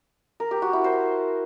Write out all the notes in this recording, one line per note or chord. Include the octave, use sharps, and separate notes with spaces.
A#4
G4
F#4
E4
C5